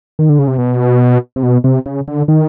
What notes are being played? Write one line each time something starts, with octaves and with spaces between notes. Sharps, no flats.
D#3
D3
C#3
C3
B2
C3
B2
C3
C#3
D3
D#3